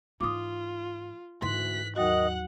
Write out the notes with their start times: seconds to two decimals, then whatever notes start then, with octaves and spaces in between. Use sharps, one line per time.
0.21 G#2 E3 F4 D6 D#6
1.42 D2 G#2 E3 C6 F#6 B6
1.96 D#2 D#3 F#3 F#4 D#5 F#5 F#6